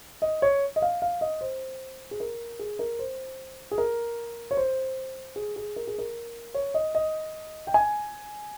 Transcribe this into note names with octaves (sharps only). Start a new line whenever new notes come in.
D#5
C#5
D#5
F5
F5
D#5
C5
G#4
A#4
G#4
A#4
C5
G#4
A#4
C#5
C5
G#4
G#4
A#4
G#4
A#4
C#5
D#5
D#5
G5
G#5